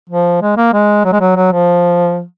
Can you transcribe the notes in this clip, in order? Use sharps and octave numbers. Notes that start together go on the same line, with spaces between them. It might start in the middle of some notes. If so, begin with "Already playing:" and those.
F3
G#3
A#3
G#3
F#3
G#3
F#3
F#3
F3